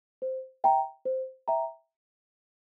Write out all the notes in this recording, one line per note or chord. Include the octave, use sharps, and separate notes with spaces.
C5
E5 G5 A#5
C5
E5 G5 A#5